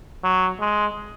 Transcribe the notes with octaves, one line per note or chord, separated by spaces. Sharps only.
F#3
G#3